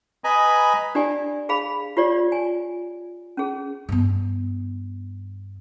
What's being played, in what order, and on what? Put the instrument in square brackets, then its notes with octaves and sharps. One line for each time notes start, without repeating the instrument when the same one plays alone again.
[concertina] B4 D#5 G#5 A#5 B5
[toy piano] D4 G4 D5 G#5
G#4 F5 B5
F4 G4 C#5 D5
G#5
C#4 G#4
[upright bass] G2 B3